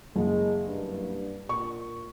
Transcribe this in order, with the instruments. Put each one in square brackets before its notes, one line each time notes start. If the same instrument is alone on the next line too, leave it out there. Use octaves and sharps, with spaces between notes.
[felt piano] F#1 [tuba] G#3
[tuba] G2
[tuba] A#2 [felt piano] C#6